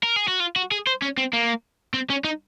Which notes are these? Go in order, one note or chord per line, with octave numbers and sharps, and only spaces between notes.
A#4
G#4
F#4
F4
F#4
G#4
C5
C#4
C4
A#3
C4
C#4
D#4